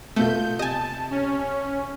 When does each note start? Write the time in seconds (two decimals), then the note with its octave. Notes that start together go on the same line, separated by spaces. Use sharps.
0.16 B2 A3 B3 F4 A4 G6
0.59 C3 D#5 G#5 A5
1.11 C#4